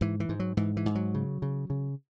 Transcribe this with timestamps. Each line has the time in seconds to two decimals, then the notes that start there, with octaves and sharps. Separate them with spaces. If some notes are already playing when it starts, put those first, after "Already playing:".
0.01 G#2 E3
0.20 E3
0.29 G#2
0.40 F#3
0.57 G#2 E3
0.77 E3
0.86 G#2
0.95 F#3
1.14 C#3
1.42 C#3
1.70 C#3